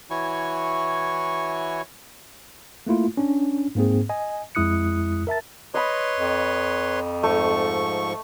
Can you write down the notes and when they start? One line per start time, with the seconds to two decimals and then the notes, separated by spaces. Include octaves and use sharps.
0.10 E3 E4 F#4 C#5 G#5 C#6
2.87 A3 A#3 E4 F4
3.17 C#4 D4
3.75 G#2 A#3 C4 G#4
4.09 D#5 G#5
4.55 F2 G#3 E4 D#6 F#6 C#7
5.27 A#4 E5 A5 A6
5.74 B4 C#5 D#5 B5 C6
6.18 F2
7.23 G#2 F3 A3 C#6